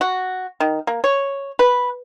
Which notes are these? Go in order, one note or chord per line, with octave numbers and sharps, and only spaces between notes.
F#4
D#3
A#3
C#5
B4